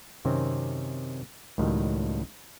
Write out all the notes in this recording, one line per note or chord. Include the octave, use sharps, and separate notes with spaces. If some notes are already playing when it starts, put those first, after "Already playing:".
F#2 C3 D#3 C4 C#4
C#2 A2 D#3 F#3 G3